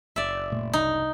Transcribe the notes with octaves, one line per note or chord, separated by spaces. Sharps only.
F#1 D5 E5
A#2 A3
C2 D#4